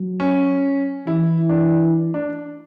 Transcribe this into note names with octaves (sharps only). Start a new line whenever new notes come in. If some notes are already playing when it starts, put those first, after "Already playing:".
Already playing: F#3
C#4
E3 E4
D4
D4